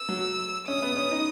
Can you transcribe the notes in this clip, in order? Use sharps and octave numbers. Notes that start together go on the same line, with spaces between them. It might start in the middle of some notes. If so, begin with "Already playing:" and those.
Already playing: E6
F#3
C#4 D#6
B3
C#4
D#4